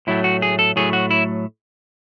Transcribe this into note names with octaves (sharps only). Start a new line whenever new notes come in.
A2 F#3 A3 E4
F#4
G#4
A4
A2 F#3 A3 G#4
F#4
E4